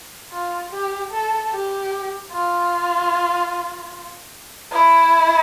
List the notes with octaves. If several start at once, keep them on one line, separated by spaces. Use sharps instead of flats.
F4
G4
A4
G4
F4
E4